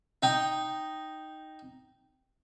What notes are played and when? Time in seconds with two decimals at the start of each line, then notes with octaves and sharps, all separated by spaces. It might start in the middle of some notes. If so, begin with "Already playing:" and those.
0.23 D#4 G5